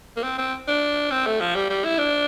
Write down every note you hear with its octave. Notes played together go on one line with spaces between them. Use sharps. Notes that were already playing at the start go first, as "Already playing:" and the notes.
A#3
C4
C4
D4
C4
A3
F3
G3
G3
E4
D4